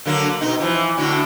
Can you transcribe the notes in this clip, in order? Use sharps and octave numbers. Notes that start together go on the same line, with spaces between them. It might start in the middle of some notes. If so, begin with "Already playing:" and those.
D3 F#3 A#3
B2 D#4
E3 F3
A2 D3 F#4